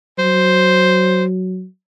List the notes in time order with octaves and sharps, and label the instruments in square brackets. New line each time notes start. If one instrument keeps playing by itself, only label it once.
[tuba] F#3 [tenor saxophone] C5